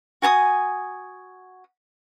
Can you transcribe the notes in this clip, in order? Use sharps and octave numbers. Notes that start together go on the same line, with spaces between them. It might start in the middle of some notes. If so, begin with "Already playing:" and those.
F#4 G#5 A5 D#6